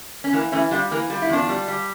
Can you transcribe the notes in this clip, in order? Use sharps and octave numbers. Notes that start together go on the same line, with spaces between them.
C#4
E3 A#3
E3 A3 C#4
G3 D4 F4
E3 A#3
G3 F4
E4
E2 D4 F4
G3
G3